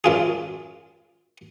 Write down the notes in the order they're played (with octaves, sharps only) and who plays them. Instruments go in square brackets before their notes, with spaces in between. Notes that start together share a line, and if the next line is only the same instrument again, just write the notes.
[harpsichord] F#2 F4 G#4